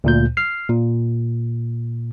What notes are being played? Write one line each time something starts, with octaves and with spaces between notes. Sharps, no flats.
D2 A#2 G6
F6 C7
A#2